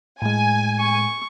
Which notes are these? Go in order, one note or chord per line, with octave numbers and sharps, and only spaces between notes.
A2 G#3 G#5
C#6